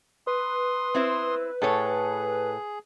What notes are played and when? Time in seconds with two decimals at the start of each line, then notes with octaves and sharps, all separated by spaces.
0.27 B4 C6 D#6
0.94 C4 E4 C5
1.62 A2 G#4 A4 C#5